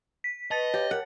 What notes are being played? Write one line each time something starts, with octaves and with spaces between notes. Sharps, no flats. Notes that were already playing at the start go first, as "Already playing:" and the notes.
B6
B4 D#5 A5 A6
G4 C#5
A#4 F#5